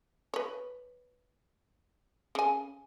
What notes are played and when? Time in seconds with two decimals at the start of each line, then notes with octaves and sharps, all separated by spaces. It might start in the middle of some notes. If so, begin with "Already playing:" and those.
0.34 B4 C#5
2.35 C#3 G#5